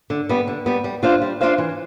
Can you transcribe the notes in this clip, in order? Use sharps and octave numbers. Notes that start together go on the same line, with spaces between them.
D3
G3 B3
D3
G3 B3
G3
D4 F4 C5 F5
G3
D4 F4 C5 F5
E3